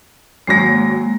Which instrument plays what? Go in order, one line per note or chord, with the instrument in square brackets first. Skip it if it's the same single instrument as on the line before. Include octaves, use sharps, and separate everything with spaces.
[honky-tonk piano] G#1 F#3 A#6 [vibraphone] G#3 A#3